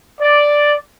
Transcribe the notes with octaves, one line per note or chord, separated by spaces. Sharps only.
D5